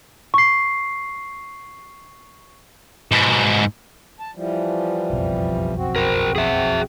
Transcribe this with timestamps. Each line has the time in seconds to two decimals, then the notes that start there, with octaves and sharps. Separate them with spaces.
0.34 C#6 C7
3.12 G#2 B2
4.20 A5
4.35 E3 F3 G3
5.10 F#1 B1 F2
5.76 C4 F#4
5.96 A#4 C5
6.36 G#4 E5